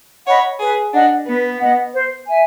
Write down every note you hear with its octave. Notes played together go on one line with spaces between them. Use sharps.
C#5 D#5 F#5 B5
G#4 B4
D4 D#5 F#5
B3 B4
D#5 F#5
C5
E5 G#5